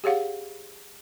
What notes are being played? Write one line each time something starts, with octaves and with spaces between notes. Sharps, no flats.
G4 G#4 C#5 F5 F#5